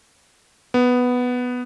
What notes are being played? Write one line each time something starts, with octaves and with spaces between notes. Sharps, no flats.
B3